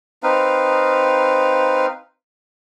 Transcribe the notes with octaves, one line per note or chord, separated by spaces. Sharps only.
C4 D#4 B4 F5